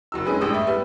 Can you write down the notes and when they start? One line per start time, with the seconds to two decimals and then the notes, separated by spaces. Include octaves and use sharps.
0.12 F#1 F#3 E6
0.25 G#3 C#4 G#4 B4
0.41 A1 G2 G#3 G4 D#6 E6
0.54 A3
0.67 G3 B3